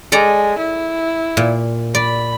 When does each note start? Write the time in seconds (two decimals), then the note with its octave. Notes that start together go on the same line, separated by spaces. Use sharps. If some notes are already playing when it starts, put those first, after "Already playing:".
0.12 G#3 A4 D5 A#5
0.58 E4
1.37 A#2
1.95 D5 B5